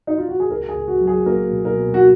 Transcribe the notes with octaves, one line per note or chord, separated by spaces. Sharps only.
D#4
F4
F#4
G#4
C#2 A#4
G#4
C#2
F#4
F#3
G#4
A#3 A#4
B2
A#4
B2
F#4